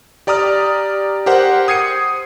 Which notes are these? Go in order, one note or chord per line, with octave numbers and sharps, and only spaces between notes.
G4 D5 A#5 D#6 F6
G4 A#4 C5 F#5
D#6 G#6 C7 C#7 D#7